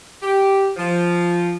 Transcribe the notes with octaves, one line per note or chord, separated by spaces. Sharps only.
G4
F3